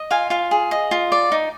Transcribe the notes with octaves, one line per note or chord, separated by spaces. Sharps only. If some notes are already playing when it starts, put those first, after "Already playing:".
Already playing: D#5
F4 F5 G#5
F4 F5
G#4
D#5
F4
D5
D#4